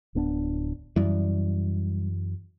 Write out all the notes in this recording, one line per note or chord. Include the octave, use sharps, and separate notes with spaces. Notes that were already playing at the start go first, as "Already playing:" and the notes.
D1 B3 D4
F#2 E3 G3